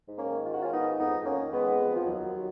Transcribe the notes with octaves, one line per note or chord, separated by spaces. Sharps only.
G#2
A#3 C#4
D#3
D#3 F4
F#4
G#2 C#4 F4
B3 D#4
G#2
F2 B3 D#4
F2
A#3 C#4
D#3
D#3 G#3 B3
F2
F2
F3
D#2 F#3
D#2